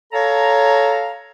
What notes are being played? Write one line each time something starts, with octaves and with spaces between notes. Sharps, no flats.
A4 C#5 F5 A5 A#5